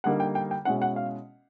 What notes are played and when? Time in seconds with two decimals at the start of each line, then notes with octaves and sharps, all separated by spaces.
0.04 D3 G3 A#3 D#4 F#5
0.20 G5
0.35 G5
0.51 G5
0.65 B2 G#3 C#4 E4 F#5
0.82 F#5
0.96 F5